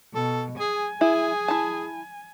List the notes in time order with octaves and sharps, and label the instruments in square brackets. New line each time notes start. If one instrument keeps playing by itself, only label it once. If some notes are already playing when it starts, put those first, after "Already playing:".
[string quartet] B2 [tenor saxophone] A4
[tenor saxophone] G#4 [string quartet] G#5
[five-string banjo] E4 [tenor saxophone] G#4
[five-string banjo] E4 A5